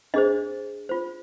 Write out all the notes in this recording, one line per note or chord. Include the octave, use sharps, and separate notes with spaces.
D4 G#4 C5 D#5
F4 C5